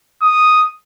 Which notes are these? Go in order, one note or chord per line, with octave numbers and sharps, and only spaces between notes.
D#6